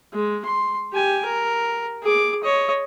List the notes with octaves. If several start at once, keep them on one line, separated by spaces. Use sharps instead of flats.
G#3
C6
G4 G#5
A#4
G#4 D6
C#5 D#5